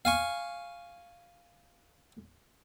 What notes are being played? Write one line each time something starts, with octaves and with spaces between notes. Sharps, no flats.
F5 G#5 C#6